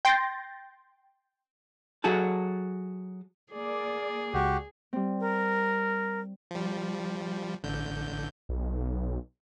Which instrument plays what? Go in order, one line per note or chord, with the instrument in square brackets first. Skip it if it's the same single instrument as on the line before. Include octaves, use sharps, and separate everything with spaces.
[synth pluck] G5 C6 G6 A6 A#6
[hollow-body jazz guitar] F#3 F#4 G#4 A4
[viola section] A#3 D5 [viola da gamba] G#4
[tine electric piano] C#2 C#3 G#3 [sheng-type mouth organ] F#4 G4
[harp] G3 C4
[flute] A#4
[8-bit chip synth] F3 G3
A1 D3 G6
[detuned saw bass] B1